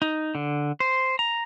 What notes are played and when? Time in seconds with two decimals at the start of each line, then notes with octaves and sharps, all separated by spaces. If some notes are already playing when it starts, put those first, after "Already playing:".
0.02 D#4
0.35 D3
0.80 C5
1.19 A#5